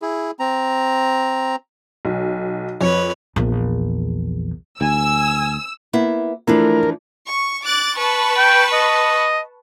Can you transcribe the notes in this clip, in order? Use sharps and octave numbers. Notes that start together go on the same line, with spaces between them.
E4 G#4
C4 A#5
B1
F2 B4 C#5
A#1 E2
D2 G#5 E6
A#3 B3 E4
E3 F3 A3 D4 E4 A#4
C#6
D6 F#6 A6
B4 A5 C#6
G5
D#5